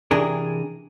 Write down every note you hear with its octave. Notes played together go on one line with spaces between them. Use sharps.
C3 E3 D4 G#4 A#4